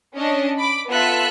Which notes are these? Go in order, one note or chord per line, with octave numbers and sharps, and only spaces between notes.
C#4 D4 D#5
B5 D6 D7
B3 F4 A4 E5 F#6